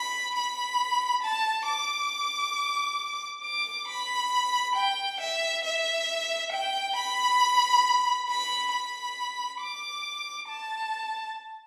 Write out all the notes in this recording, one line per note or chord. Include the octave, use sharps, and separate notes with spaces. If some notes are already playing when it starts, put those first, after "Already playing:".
Already playing: B5
B5
A5
D6
D6
B5
G5
E5
E5
G5
B5
B5
B5
D6
A5